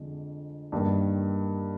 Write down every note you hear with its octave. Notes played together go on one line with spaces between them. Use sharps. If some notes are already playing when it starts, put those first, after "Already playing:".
Already playing: F2 D3 G#3
G2 D#3 A#3